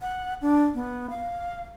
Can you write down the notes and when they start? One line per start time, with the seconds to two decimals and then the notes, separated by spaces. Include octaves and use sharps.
0.01 F#5
0.42 D4
0.74 B3
1.10 F5